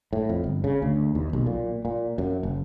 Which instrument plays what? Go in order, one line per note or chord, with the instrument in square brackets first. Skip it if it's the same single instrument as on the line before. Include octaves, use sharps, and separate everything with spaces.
[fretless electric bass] A2
F2
G1
C#3
D2
D#2
B1
A#2
A#2
F#2
F#1